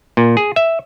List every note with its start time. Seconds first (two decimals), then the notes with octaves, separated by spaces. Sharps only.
0.17 A#2
0.37 G#4
0.56 E5